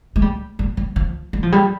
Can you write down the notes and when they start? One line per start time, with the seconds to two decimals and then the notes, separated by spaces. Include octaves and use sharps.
0.16 G#3
0.22 G3
0.59 G3
0.77 G3
0.96 F3
1.33 G3
1.43 F3
1.52 G3